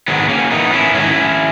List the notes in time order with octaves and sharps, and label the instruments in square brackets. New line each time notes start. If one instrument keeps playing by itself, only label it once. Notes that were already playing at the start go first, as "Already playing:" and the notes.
[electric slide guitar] G#2 D#3 F#3 G#3 B3
A#3 C#4
E2 C#3 E3 B3 D#4
C#4 E4
G#2 D#3 F#3 C#4 E4